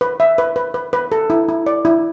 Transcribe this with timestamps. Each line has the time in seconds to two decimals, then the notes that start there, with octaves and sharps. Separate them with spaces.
0.01 B4
0.20 E5
0.38 B4
0.56 B4
0.74 B4
0.93 B4
1.12 A4
1.30 E4
1.48 E4
1.66 D5
1.85 E4